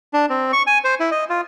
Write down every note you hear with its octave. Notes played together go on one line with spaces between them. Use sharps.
D4
C4
C#6
G#5
C5
E4
D#5
F4